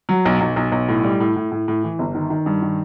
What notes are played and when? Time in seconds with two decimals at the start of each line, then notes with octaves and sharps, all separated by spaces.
0.09 F#3
0.26 B1
0.41 B1
0.56 B1
0.72 B1
0.88 A2
1.04 G3
1.20 A2
1.36 A2
1.52 A2
1.68 A2
1.84 E3
1.99 G1
2.15 D#3
2.30 D#3
2.46 G2
2.62 D#3